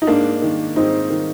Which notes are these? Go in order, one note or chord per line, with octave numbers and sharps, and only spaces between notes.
D#4
G#2 A#3 D4
D#3
G#2 C4 D#4
D#3